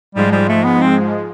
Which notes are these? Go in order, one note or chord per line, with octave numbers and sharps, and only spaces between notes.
G#2 F3 G3 G#3
G3
A3
B3
C4